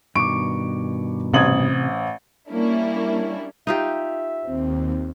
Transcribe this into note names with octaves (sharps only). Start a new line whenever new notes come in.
G2 B2 D#3 C#6 D6 D7
A1 C3 C5 D#6 G#6 F#7
G3 A#3 C#4 D4 E4
D#4 F4 G4 E5
D#2 C4